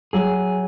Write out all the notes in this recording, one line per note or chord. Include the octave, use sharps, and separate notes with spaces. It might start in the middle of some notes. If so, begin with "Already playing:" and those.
F#3 G#4